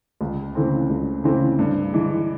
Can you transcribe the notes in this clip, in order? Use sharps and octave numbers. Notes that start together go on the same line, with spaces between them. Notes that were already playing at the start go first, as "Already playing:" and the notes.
C#2
C#3 E3 A3 C4
C#2
C#3 E3 A3 C4
G2
E3 G#3